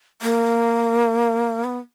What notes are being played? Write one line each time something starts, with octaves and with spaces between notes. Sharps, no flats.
A#3
B3